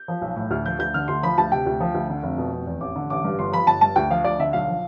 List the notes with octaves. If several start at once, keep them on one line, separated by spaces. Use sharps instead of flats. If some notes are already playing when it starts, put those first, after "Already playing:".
Already playing: G6
F3
B1
A2
D2 F6
F3 G6
D2 G6
D3 F6
D2 C6
F3 B5
D2 A5
C3 G5
D2
F3
D2
D3
F1
B2
F1
E2
A1 D6
D3
A1 D6
G2
G1 C6
F3 B5
G1 A5
G2 A5
D2 G5
F3 F5
D2 D5
D3 E5
B1 F5
F3